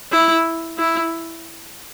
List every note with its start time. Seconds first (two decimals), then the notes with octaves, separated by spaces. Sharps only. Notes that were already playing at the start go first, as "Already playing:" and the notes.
0.12 E4
0.78 E4